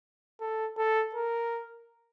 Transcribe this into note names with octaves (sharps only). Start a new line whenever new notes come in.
A4
A4
A#4